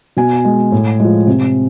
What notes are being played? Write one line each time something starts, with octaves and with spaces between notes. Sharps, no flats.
B2 G#5
G#3
A2
F3 G#3
C3